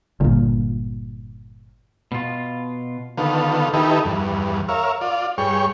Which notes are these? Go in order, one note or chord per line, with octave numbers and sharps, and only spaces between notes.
G1 A#2
B2 F4
D3 D#3 B3 F4 A4
D#3 D#4 E4 G4 A4 B4
E2 G2
A#4 C#5 E5 F5
F4 D5
G2 G#4 C#5 G5 C#6